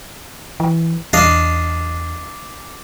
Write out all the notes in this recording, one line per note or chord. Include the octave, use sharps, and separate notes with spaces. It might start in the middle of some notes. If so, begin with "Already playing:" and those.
E3
E2 D4 D#5 F5